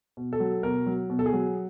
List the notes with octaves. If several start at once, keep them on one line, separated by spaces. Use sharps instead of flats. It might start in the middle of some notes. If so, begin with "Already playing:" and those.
B2
A4
F#3
B2 A#4
F#3
B2
A4
G#4
F#3